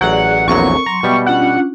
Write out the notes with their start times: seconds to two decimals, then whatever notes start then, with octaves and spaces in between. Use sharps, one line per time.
0.01 A1 F#3 G#4 D5 F#5
0.48 A#1 E2 F#3 C4 A4 A#4 C#6
0.86 F#3 A#5 C6
1.03 B2 G3 B3 E5 G5
1.26 C#4 D4 F4 F#5